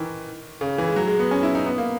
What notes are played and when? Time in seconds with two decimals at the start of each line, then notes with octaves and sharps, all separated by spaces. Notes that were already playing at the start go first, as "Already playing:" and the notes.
Already playing: D#3 E3
0.61 C#3
0.78 E3
0.88 G#3
0.96 F#3
1.08 G#3
1.19 B3
1.31 C#4
1.43 E4
1.55 D#4
1.66 B3
1.78 A#3